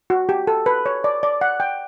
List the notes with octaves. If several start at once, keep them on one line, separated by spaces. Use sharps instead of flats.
F#4
G4
A4
B4
C#5
D5
D5
F#5
G5